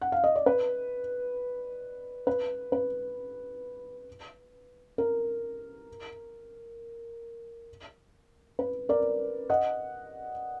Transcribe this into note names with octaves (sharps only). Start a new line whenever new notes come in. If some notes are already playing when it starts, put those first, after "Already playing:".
F#5
F5
D#5
D5
B4
B4
B4
A#4
B4
A#4 D5
D#5 F#5